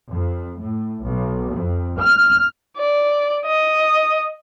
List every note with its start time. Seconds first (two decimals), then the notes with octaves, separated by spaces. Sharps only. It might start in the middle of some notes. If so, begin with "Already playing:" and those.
0.11 F2
0.60 A2
1.03 B1
1.55 F2
1.99 F6
2.78 D5
3.45 D#5